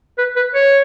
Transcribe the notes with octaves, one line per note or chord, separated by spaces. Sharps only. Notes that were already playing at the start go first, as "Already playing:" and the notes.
B4
B4
C#5